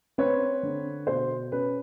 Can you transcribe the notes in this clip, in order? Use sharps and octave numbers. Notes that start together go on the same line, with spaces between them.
C4 B4 C#5
D3
B2 C5
C#4 B4